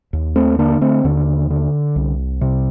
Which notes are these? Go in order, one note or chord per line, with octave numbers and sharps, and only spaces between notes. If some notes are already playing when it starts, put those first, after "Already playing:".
D#2
A3 C4
D3 A#3 D4
A3 C4
D#2 D3
D3
C2
C3